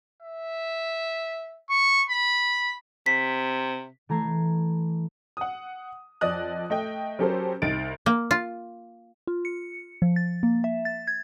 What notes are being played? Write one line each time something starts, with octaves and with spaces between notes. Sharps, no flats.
E5
C#6
B5
C3 B6
E3 A3 A5 A#5 G#6 C7
F#5 D#6
F2 D5 D#5 D#6 F#6
A3 D#5 G5
F#3 C#4 G4 A4 A#4 C5
C2 D#4 A6 D7
A#3
F4
F4
C#7
F3
A6
A#3
E5
A6
G#6